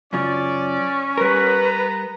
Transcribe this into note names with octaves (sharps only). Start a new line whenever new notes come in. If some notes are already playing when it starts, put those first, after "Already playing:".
F#2 C#3 C#4 F4 D5
G3 B3 A#4 B4 A#5